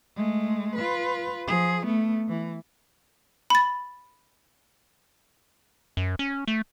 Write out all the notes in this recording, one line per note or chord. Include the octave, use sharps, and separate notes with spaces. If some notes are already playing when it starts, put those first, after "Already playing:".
G#3 A3
F4 B4
F3 G#4
A3 B3
E3
B5 A6
F#2
C#4
A3